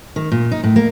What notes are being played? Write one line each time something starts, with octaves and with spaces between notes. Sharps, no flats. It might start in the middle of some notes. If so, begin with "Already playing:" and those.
D#3
A#2
D#4
A2
A#3